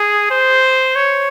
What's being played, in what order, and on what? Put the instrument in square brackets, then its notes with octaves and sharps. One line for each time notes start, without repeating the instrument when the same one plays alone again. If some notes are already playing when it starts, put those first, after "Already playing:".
Already playing: [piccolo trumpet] G#4
C5
C#5